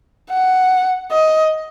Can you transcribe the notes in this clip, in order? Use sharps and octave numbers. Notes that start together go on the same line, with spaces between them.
F#5
D#5